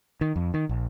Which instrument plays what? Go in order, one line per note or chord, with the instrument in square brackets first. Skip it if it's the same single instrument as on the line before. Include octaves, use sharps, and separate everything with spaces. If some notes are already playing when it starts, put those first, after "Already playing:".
[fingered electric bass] D#3
F2
D#3
A#1